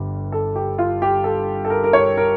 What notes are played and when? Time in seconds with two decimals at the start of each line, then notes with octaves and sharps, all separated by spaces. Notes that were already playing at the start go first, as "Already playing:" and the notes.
Already playing: G1 G2 D3 G3
0.32 A4
0.56 G4
0.78 F4
1.02 G4
1.24 A4
1.65 A4
1.70 A#4
1.84 A#4
1.93 C#5
2.17 A#4